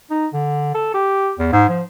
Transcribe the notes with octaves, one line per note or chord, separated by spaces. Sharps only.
D#4
D3
A4
G4
E2
G#2
F3